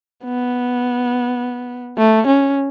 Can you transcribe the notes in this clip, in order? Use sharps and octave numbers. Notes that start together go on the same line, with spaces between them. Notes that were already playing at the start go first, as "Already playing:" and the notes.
B3
A3
C#4